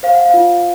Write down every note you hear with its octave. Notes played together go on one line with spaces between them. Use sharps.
C5 F5
F#5
F5
F4